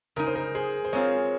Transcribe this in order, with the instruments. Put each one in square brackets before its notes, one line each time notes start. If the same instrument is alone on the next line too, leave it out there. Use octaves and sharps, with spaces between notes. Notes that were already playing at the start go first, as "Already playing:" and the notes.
[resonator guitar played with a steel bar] C#3 G#3 D#4 [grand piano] A#4
[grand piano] C5
A#4
G#4 C5
C5
[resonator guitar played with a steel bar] G#3 C4 F4 [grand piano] A#4 C#5